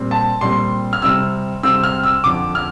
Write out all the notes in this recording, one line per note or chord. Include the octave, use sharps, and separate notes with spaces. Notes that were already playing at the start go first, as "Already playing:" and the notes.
Already playing: A#2 G3 C4
A5
A#2 G3 C4 C6
F6
C3 G3 C4 E6
C3 G3 C4 E6
F6
E6
F2 D3 F3 D6
F6